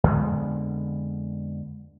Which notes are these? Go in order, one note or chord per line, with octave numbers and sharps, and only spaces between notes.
F2 D3 G#3 B3